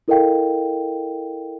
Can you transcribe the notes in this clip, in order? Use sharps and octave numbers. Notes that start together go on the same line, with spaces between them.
E4 A4 A#4 D#5 F5 G5